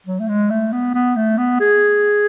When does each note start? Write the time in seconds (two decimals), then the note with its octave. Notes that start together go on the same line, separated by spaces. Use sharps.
0.07 F#3
0.20 A3
0.28 G#3
0.50 A3
0.72 B3
0.94 B3
1.16 A3
1.37 B3
1.60 G#4